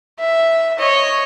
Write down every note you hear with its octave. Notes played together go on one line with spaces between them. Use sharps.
E5
C#5 D#5